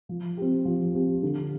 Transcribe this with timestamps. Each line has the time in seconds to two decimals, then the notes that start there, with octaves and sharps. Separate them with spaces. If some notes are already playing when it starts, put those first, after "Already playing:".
0.09 F3
0.37 C4 G4
0.65 F3
0.94 C4 G4
1.23 D3